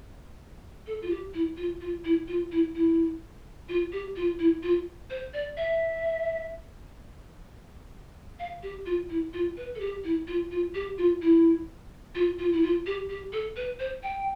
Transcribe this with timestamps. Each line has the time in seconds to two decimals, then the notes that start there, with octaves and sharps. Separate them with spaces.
0.87 A4
1.02 F4
1.10 G4
1.34 E4
1.57 F4
1.81 F4
2.04 E4
2.28 F4
2.52 E4
2.75 E4
3.69 F4
3.93 G4
4.16 F4
4.39 E4
4.63 F4
5.10 C5
5.34 D5
5.57 E5
8.39 F5
8.63 G4
8.86 F4
9.10 E4
9.33 F4
9.57 B4
9.75 A4
9.80 G4
10.04 E4
10.27 F4
10.51 F4
10.75 G4
10.98 F4
11.22 E4
12.15 F4
12.39 F4
12.53 E4
12.63 F4
12.86 G4
13.09 G4
13.33 A4
13.56 B4
13.80 C5
14.03 G5